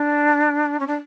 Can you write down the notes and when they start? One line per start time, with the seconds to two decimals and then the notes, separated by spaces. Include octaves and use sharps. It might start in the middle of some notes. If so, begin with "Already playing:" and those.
Already playing: D4
0.80 C#4
0.87 D4